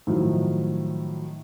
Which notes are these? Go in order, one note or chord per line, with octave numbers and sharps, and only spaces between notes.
A2 D#3 F3 F#3